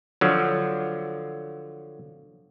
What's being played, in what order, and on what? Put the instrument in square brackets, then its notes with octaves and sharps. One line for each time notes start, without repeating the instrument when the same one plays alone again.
[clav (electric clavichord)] D3 F3 F#3